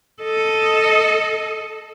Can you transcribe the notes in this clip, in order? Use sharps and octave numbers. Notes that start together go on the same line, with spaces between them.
A4 D#5